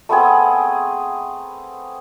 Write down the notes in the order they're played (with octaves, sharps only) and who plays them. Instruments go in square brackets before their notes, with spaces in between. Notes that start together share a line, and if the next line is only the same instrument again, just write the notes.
[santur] A3 B3 C4 G#4